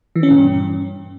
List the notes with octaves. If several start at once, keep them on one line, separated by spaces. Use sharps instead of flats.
E3
C#4
A#2
G2